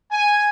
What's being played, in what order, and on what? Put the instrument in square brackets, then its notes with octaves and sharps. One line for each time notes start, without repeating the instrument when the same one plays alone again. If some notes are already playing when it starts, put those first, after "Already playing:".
[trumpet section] G#5